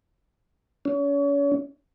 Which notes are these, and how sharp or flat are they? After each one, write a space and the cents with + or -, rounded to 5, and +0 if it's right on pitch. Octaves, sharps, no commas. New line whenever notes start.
C#4 +35